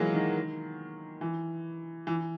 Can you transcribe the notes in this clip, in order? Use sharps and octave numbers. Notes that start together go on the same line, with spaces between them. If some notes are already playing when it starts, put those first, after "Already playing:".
Already playing: E3 F#3 G#3 A#3
D#3
E3
E3